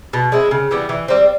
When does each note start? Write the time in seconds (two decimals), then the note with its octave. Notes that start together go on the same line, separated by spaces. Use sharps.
0.13 B2
0.32 G#3 C4 E4
0.51 C#3
0.71 E3 G3 B3
0.89 E3
1.08 G3 C4